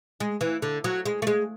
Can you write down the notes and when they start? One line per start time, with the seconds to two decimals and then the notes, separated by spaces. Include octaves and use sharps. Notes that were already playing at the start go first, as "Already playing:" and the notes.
0.20 G#3
0.41 E3
0.62 D3
0.84 F#3
1.05 G#3
1.22 A3
1.27 G#3